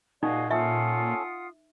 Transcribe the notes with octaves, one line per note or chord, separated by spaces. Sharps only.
A#2 D#4 F#4 G#4 D5 D#5 F5 G#5
C#4 F4 A4 E5 F#5 D#6